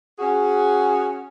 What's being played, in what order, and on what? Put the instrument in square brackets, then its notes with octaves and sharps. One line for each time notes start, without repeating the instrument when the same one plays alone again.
[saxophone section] C#4 F#4 G#4